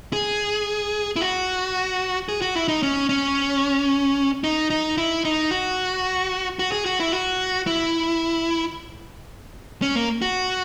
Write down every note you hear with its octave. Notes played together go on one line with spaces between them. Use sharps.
G#4
E4
F#4
G#4
F#4
E4
D#4
C#4
C#4
D#4
D#4
E4
D#4
F#4
F#4
G#4
F#4
E4
F#4
E4
C#4
A#3
F#4